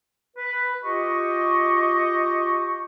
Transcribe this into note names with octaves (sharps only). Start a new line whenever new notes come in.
B4
F4 G4 D#5 C#6